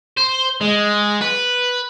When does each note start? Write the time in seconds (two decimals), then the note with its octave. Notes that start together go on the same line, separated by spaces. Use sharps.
0.17 C5
0.61 G#3
1.21 B4